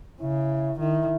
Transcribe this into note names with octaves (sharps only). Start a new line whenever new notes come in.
C#3 E4
D#3 E4